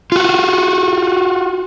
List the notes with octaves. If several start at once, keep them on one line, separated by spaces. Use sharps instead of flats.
F4 F#4